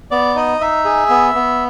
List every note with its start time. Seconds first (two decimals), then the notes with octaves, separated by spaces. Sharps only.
0.11 B3 D5
0.35 D#4 D#5
0.61 D#4 E5
0.85 G#4
1.10 B3
1.35 B3